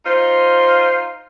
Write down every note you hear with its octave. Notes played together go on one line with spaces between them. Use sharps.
D#4 F4 C5